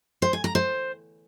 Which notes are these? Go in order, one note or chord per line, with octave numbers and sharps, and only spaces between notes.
C5
G#5
A#5
C5